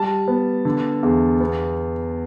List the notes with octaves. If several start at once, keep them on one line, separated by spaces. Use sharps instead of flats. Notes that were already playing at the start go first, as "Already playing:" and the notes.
Already playing: G3 A5
B3
D3
E2
B3